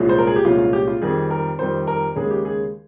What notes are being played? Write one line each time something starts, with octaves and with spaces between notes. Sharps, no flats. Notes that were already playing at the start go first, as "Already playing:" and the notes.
Already playing: C2 A#2 F3 G#3 C#4
C5
A#4
G#4
G4
C2 A#2 F3 G#3 C#4 F4
F4
G4
F4
F2 D#3 G3 G#4
A#4
F2 D#3 G3 C5
A#4
D#2 C#3 G#3 C#4 G#4
G4
G#4